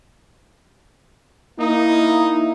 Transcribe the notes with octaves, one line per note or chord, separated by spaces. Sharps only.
A#3 D#4 E4